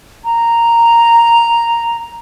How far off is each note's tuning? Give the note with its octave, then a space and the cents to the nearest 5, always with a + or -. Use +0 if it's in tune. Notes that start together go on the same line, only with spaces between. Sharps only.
A#5 -5